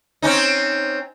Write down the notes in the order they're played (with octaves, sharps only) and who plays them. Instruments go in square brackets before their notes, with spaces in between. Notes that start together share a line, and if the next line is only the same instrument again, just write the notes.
[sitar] C4 C#4 D#4